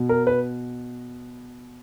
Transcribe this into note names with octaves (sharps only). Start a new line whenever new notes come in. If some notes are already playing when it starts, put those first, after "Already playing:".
Already playing: B2
A#4
B4